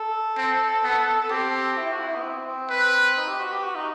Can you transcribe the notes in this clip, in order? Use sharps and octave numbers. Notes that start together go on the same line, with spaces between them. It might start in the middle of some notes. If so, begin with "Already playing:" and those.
Already playing: A4
C4
B3
C4 G4
E4
F#4
E4
B3
C4
C4
B4
D#4
G4
F#4
G4
F#4
D#4